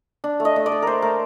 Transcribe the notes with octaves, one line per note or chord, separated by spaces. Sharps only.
D4
A3
D#5
A3
D5
A3
A3 A#4 C5
A3 A#4